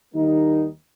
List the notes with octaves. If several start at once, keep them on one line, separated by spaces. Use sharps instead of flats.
D#2 D#3 G3 A#3 D#4